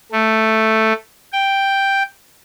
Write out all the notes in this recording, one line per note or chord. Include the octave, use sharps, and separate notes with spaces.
A3
G5